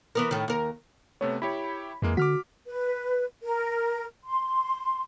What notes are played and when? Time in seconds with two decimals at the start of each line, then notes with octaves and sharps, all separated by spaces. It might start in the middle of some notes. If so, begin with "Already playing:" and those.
0.15 E3 B3 A#4
0.31 A2 D#3
0.48 D#2 A#4
1.21 C3 A3 B3 C#5
1.42 E4 G4 C#5 B5
2.02 F2 E3 G#3 A#3
2.17 D3 F#4 D6 F6 B6
2.67 B4
3.43 A#4
4.25 C6